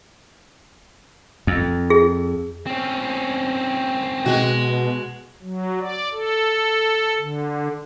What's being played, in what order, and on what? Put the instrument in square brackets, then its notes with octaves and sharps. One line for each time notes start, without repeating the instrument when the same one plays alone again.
[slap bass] F2
[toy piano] G#4
[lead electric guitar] C4 C#4
[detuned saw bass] B2 [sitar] G#3 F#4
[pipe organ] F#3
D5
A4
D3